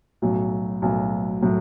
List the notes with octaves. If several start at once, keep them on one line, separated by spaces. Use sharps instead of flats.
B1 A2 F#3
B1 A2 F#3
A2 F#3